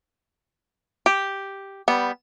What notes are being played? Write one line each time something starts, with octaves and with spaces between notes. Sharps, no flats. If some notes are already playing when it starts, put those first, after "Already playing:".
G4
G3 B3